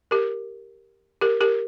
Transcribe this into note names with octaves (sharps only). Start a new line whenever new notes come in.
G4 A#4
G4 A#4
G4 A#4